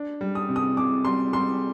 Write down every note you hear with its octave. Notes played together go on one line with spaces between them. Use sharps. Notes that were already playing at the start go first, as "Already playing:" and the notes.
Already playing: D4
G3
D#6
C3
D#6
C3 D6
G3 C6
G3 C6